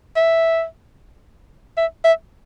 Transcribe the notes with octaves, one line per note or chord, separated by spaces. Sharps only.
E5
E5
E5